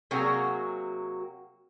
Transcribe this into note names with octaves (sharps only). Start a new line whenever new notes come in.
C3 F#3 A#3 F#4 G#4